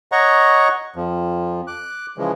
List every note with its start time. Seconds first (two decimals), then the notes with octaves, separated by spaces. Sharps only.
0.12 C#5 D#5 F#5 A#5 C#6
0.96 F2 F3
1.67 D6 F#6
2.18 C#3 E3 F3 G#3